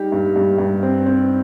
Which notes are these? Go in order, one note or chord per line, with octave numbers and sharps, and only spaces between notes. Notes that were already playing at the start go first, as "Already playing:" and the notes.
Already playing: G3 D#4 G4
G2
G2
G2
C4
C4